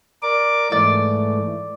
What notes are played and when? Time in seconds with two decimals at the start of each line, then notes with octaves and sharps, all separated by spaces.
0.22 A#4 D5 D6
0.72 G#2 E3 A3 D5